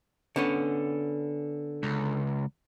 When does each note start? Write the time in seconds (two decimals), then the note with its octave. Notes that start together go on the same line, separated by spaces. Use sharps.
0.36 D3 B3 C#4
1.83 C#2